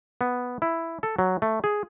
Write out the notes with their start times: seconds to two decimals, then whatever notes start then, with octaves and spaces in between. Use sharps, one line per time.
0.21 B3
0.62 E4
1.03 A4
1.19 F#3
1.42 A3
1.64 G#4